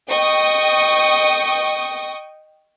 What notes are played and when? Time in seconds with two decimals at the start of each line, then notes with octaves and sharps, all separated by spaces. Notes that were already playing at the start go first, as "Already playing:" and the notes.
0.10 D#5 G5 C#6 D#6